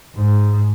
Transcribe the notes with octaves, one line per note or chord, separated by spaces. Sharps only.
G#2